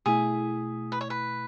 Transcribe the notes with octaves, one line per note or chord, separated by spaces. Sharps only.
B2 A3 E4 G#4
B4
C#5
B4